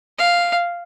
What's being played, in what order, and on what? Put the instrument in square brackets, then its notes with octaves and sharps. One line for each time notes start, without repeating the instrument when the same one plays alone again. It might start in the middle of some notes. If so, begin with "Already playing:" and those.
[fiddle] F5